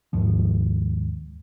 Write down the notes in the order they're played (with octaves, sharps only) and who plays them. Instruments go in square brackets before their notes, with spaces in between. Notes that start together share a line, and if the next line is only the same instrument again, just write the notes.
[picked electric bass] D#2 G#2 F3